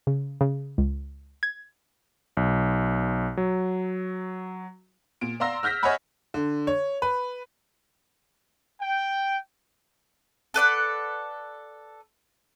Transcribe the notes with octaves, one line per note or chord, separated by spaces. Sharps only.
C#3
C#3
C#2
G#6
B1
F#3
A#2 D7
D5 F5 A#5 C6 E6 A#6
E6 F6 G6 A#6 B6
C#5 D#5 E5 F#5 G#5 B5
D3
C#5
B4
G5
A4 B4 D5 F#5